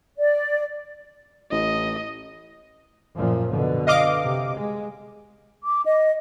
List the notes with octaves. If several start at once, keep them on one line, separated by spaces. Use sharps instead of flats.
D5
A1 D#5
F#2 A#2 F3
B2 D3
D#5 F5 D6
C3
G#3
D6
D#5